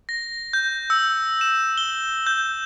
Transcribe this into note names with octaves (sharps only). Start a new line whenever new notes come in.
A#6
G6
E6
E7
G7
G6